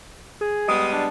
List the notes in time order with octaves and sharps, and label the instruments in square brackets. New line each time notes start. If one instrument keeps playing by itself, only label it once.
[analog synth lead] G#4
[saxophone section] G3 G#3 B3 [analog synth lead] D#6
[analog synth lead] D4